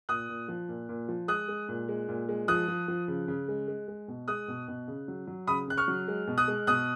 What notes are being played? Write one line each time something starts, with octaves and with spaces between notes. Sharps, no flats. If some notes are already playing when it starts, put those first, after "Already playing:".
A#2 D#6 F#6
A#2
F3
A#2
A#2
F3
G#3 D#6 F#6
G#3
A#2
G#3
A#2
G#3
F3 D#6 F#6
F3
F3
C#3
C#3
G#3
G#3
G#3
B2
G#3 D#6 F#6
B2
B2
C#3
F#3
F#3
C#3 B5 D#6
C#3 F#6
C#6 F6
F#3
G#3
B2
D#6 F#6
G#3
B2 D#6 F#6